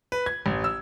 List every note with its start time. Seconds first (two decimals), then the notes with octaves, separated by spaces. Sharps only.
0.12 B4
0.26 G#6
0.46 A1
0.64 E6